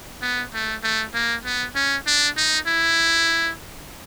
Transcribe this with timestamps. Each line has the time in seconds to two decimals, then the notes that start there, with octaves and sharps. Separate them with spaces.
0.22 B3
0.54 A3
0.84 A3
1.14 A#3
1.45 B3
1.75 C#4
2.07 D4
2.37 D#4
2.67 E4